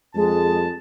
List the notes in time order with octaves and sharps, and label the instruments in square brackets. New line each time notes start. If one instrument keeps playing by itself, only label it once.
[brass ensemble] F2 A5 [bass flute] G#3